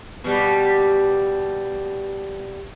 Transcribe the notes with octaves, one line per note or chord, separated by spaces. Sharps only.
B2 G3